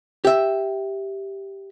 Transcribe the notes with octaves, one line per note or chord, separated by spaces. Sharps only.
G4 E5